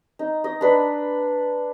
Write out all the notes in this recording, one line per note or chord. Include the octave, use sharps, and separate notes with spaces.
D#4
D#5
D4 B4